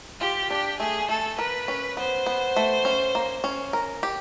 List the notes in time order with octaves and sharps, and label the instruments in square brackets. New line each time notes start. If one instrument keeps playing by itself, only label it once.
[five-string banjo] F4 [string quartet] G4
[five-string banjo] D4 [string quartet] G4
[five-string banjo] A3 [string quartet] G#4
[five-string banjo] A3 [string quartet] A4
[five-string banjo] A#4 [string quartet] B4
[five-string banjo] C#4
[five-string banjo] B3 [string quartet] C5
[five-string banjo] B3
A3
C#4
A#3
C#4
A#4
G4